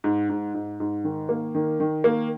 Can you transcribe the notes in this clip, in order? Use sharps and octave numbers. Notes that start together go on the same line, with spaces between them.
G#2
G#2
G#2
G#2
D#3
A#3
D#3
D#3
A#3